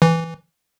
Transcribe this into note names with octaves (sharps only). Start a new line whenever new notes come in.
E3